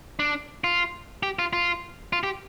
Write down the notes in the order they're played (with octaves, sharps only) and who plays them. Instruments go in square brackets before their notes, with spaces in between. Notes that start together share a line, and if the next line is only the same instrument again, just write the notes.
[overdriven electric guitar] D4
F4
G4
F4
F4
F4
G4